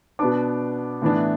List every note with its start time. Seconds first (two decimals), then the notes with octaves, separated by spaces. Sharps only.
0.19 B2 B3 D4 D6
1.02 A2 E3 B3 D4